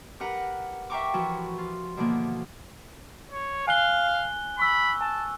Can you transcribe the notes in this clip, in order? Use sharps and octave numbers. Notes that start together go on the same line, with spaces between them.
G4 A#4 B4 F#5 A#5
E5 F5 G5 A#5 C#6 D6
E3 F3 F#4
F4
B2 D3 E3 F3 A#3
C#5
F5 G#5 F#6 G7
B5 C#6 E6
G#5 A5